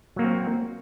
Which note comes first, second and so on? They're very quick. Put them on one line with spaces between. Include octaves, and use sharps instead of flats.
F#3 A#3 F#4 C4